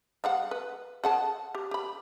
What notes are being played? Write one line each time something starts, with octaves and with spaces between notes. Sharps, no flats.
G3 F5 F#5
B4
G#4 F#5 A5
G4
G4 B5